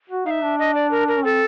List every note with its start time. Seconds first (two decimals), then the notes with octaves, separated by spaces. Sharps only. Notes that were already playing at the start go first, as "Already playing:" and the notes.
0.10 F#4
0.26 D#4 F5
0.31 E5
0.42 D4
0.59 D#5
0.75 D5
0.91 A#4
1.08 A#4
1.17 C#4
1.24 C4 A4